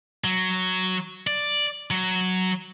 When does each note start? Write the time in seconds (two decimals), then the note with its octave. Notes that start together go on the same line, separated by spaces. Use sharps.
0.24 F#3
1.27 D5
1.90 F#3